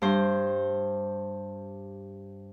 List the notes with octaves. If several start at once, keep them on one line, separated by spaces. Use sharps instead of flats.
G2 C5